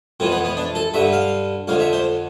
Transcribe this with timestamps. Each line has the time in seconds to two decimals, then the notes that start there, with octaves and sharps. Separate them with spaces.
0.20 F2 E3 C4
0.32 B3
0.45 B3
0.57 D4
0.75 A4
0.94 G2 D3 E5
1.12 F5
1.68 F2 D3 F5
1.80 E5
1.93 C5